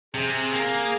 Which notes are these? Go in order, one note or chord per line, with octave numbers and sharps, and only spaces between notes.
C3 G#4
A#3